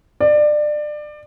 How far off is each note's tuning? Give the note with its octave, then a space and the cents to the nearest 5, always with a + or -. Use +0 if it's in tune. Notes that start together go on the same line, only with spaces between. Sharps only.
D5 +25